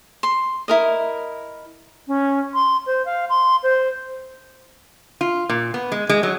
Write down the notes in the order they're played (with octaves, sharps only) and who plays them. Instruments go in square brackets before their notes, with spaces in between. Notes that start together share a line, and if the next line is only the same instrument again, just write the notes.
[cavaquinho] C6
E4 A#4 D#5
[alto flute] C#4
C6
C5
F5
C6
C5
[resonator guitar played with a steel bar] F4
A#2
B3
G#3
G#3
F#3